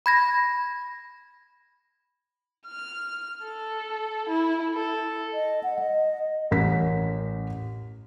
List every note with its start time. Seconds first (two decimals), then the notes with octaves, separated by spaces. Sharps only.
0.06 B5 G#6 A#6
2.67 F6
3.44 A4
4.29 E4
4.75 A4
5.33 D#5
5.63 F#5
5.79 D#5
6.51 A1 C#4 A#4 B6